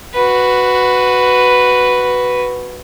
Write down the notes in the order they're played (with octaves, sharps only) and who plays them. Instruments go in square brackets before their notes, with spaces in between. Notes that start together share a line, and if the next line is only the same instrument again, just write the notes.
[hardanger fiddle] F#4 B4